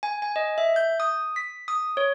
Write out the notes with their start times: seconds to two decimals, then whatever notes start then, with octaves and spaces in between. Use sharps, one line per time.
0.03 G#5
0.22 G#5
0.36 D#5
0.58 E5
0.76 G6
1.00 D#6
1.36 B6
1.68 D#6
1.97 C#5